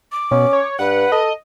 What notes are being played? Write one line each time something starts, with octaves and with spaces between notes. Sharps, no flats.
D6
B2 C#4
C#5
G2 B4 F#5
A4 D#5